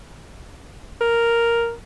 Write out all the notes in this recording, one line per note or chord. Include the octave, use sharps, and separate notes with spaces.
A#4